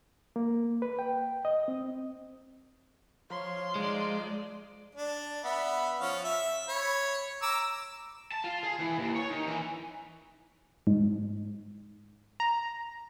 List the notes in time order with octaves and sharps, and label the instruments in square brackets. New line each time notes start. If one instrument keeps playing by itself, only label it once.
[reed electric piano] A#3
B4
G5
D#5
C4
[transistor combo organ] F3 [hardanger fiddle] C#5 [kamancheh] C6
[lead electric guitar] G#3 [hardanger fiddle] D#4 D5
[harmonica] D4
B3 E5 B5
F3 C#4 F5
E5
C#5 B5
A#5 D6 E6
[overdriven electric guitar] A5
F4
G#4
E3
D#2
C#5
D#3
E3
[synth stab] G#2
A#5